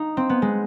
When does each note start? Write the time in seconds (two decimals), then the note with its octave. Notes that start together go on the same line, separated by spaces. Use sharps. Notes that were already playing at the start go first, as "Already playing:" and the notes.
Already playing: D#4
0.17 C4
0.30 B3
0.42 G#3